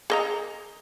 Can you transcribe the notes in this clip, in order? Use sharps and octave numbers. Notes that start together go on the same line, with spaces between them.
G#4 D#5 A#5